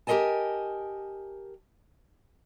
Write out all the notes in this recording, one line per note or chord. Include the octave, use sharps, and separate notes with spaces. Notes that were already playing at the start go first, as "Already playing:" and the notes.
G4 A#4 C5 D#5 G#5 A5